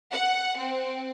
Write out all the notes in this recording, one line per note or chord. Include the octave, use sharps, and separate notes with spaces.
F#5
C4